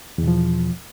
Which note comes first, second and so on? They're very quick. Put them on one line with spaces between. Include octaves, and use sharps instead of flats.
E2 B2 F3